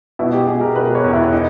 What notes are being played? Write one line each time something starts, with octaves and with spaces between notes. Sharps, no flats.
B2 E4
G4
B2 G#4
A#4
B2 B4
C#5
E2
E4
D#4